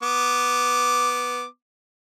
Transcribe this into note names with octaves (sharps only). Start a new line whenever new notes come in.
B3 D6